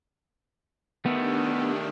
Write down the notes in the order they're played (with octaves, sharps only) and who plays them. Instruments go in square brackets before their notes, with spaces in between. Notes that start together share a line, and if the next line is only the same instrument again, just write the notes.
[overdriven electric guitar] D#3 A3 [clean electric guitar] B3 [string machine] D4 G4